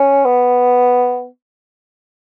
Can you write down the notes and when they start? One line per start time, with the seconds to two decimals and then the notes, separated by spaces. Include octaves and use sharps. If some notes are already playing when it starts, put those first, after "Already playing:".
Already playing: C#4
0.25 B3